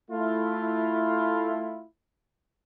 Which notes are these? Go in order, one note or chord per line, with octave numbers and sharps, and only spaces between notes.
A3 E4 F4